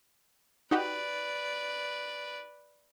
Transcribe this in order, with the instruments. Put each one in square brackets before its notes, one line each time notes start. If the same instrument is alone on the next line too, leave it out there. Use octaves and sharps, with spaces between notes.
[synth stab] D#4 F#4 G4 [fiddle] B4 D5